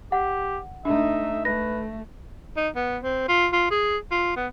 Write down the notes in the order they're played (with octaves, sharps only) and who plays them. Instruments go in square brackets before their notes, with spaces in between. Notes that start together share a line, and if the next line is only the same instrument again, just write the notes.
[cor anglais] G4 [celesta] F#5
[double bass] A3 D#4 [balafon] D4 [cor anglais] E5
[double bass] A3 [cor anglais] B4 [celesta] A#6
[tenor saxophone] D#4
B3
C4
F4
F4
G#4
F4
B3